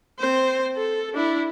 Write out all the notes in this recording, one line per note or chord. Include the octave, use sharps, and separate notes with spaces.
C4 C5
A4
D4 E4